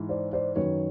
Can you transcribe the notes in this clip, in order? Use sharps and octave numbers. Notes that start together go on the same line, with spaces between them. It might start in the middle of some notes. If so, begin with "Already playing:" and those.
Already playing: G#2 E3
C5 D5
C5 D5
F#2 D#3 B4 C#5